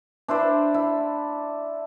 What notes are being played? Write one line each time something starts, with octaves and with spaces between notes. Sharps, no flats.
D4 E4 C5 D5
E4